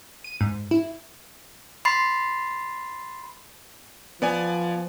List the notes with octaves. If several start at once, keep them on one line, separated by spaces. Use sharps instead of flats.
D#7
G#2
E4
B5 C6 A6 C7
F3 B3 D5 G#5